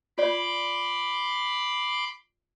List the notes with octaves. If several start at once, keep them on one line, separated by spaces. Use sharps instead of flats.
F4 D5 B5 C6 D6